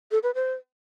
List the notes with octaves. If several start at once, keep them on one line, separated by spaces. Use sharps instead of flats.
A4
B4
C5